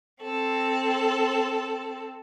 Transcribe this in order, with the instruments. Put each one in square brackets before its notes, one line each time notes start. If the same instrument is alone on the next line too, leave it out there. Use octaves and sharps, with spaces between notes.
[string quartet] C4 A4